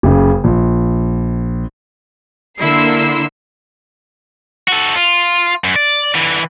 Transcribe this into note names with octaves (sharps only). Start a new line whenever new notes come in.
F#1 C#3
A#1
D3 A#3 E4 C6 E6 C7
F#4 A4
F4
F#2
D5
D3 E3